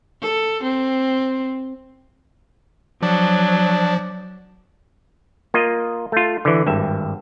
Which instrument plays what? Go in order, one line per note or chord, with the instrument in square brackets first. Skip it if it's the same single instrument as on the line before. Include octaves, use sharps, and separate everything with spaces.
[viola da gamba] A4
C4
[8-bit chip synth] F3 [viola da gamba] F#3 [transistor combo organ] D4
[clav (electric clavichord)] A#3 F4 D#5
A3 F4
D3 E3
G#1 G2 E5